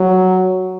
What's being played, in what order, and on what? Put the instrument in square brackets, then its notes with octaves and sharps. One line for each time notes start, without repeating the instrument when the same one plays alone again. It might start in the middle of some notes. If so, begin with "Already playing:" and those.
Already playing: [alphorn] F#3